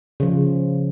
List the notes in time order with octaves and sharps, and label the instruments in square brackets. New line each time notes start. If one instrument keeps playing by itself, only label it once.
[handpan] C#3 F3